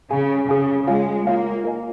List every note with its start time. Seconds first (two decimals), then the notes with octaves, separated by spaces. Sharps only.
0.10 C#3 G#4 F5 G#5
0.49 C#3 G#4 F5 G#5
0.87 G#3 F4 C#5 F5 G#5
1.25 A#3 F4 C#5 F5 G#5
1.64 F4 A#4 D#5 G#5